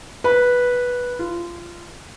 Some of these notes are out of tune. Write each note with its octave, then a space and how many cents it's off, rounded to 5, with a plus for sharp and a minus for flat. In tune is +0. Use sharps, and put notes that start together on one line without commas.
B4 -10
F4 -20